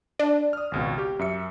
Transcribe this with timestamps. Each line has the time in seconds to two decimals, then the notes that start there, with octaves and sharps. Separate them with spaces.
0.19 D4
0.53 D#6 F6
0.72 G#1 C#2 B2
0.98 G4
1.19 F#2 E5 C#7